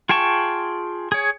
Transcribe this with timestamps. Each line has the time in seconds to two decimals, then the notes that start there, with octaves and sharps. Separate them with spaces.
0.09 F4 G#4 G5 A5 C#6
1.12 G#4 C#5